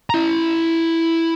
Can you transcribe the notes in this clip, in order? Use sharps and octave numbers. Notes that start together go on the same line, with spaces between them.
E4 A#5